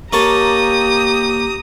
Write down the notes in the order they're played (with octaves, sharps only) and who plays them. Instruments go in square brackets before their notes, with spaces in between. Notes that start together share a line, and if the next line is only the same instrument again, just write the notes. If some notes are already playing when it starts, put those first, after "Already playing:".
[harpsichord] A#3 C#5 A5 [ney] G4 [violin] A#5 D#6